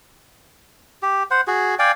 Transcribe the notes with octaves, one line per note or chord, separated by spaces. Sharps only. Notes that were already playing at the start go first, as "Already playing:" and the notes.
G4
C5 F#5
F#4 G#4
D5 F5 G5 G#5